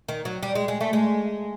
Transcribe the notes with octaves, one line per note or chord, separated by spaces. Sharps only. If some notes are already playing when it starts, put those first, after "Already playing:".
D#3
F#3
G3
G#3
G#3
A3
G#3